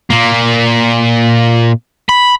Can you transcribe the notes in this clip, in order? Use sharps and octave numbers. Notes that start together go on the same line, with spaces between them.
A#2 A#3
B5